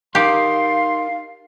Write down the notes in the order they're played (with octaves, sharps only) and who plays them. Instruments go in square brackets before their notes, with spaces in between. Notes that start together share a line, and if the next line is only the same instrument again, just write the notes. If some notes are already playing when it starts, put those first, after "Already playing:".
[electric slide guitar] D#4 A#4 [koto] G4 [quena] F5 [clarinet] C6